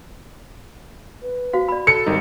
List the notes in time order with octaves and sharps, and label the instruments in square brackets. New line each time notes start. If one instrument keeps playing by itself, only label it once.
[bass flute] B4
[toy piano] F#4 C5 F5
[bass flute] F#4 [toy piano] D5 B5
[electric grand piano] A4 [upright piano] C#7
[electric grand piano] G#1 G3 D#4 [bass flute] A#4